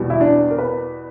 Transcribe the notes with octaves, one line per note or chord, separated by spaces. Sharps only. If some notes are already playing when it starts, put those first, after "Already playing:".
Already playing: E2 B2 G3
E4
D4
A#4
B4